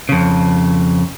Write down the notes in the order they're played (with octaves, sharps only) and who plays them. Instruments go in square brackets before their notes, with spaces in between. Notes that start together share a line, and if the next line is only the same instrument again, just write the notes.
[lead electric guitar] F2 C#3